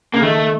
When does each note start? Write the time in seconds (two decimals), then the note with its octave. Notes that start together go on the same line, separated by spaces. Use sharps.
0.14 C#3 A#3
0.22 D#3 A3